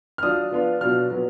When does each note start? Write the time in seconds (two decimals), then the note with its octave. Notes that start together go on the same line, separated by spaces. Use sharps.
0.18 F6
0.23 F#3 D4 F4 D#6
0.51 F3 B3 D4 F4
0.81 B2 F#3 D4 F4 F6
1.10 A#2 F#3 B3